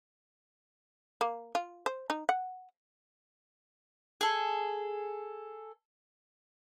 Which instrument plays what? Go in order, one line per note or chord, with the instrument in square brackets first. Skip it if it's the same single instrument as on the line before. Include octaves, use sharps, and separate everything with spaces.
[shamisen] A#3
F4
C5
D#4
F#5
[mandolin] G#4 A4